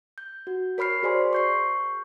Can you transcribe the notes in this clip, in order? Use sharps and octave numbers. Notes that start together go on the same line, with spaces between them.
G6
F#4
A#4 C#5 B5 F6 C7
F#4 G#4 C5 D5 G#5 C6
C#6 G6 C7